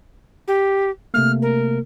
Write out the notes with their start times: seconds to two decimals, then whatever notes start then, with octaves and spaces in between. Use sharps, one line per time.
0.47 G4
1.14 C3 A3 A#3 F6
1.42 A#4